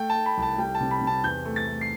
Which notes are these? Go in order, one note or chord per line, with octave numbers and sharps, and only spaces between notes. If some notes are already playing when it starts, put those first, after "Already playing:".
Already playing: A3 G5
A5
A3
B5
C2
A5
G3 G5
A5
C3
B5
C3
A5
E2 G6
A3
A6
A3
C7